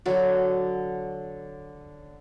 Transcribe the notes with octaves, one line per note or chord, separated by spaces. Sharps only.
D3 F#3 F#4